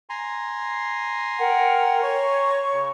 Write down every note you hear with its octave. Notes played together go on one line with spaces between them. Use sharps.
G#5 A#5 C6
A#4 F#5 G5
C#5 C#6
C#3